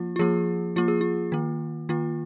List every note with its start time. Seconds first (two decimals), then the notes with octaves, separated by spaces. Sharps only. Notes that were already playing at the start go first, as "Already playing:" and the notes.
Already playing: F3 A#3 F4
0.16 F4
0.19 F3 A#3 G#4
0.76 F3 A#3 F4
0.88 G#4
1.01 F4
1.32 D#3 A#3
1.89 D#3 A#3 F4